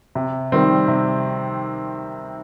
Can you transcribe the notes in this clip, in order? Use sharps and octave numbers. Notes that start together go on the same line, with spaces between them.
C3
D#3 G3 C4
C3